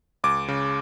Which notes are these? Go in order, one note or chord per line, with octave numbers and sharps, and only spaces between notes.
C#2 D6
C#3